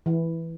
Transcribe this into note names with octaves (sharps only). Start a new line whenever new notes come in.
E3